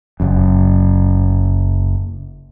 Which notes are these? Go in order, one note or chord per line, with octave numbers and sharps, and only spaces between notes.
F#1 F#2